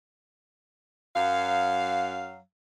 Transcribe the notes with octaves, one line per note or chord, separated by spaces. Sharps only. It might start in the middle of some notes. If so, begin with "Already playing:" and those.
F#2 F#3 F5